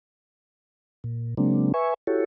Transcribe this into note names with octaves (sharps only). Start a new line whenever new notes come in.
A#2
C#3 F#3 G#3 A#3 C4 D4
B4 E5 G#5 C#6
E4 F#4 G4 A4 C#5